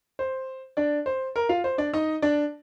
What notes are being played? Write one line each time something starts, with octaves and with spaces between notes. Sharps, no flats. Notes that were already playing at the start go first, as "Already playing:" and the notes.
C5
D4 D5
C5
A#4
F4 F5
C5
D4 D5
D#4 D#5
D4 D5